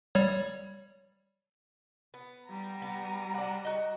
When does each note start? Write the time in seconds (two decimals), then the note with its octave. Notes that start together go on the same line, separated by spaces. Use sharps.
0.15 G3 C#5
2.14 B3
2.49 G3 A#5
2.82 B3
3.34 D4 F#5
3.65 F#4 D#5